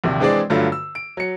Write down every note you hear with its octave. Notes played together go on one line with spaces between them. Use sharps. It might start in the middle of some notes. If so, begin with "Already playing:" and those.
A#1 D#2 C3
E3 G#3 C4 D4 G#4 D5
G2 D3 F#3 A3 F4
E6
D7
F#3 C#7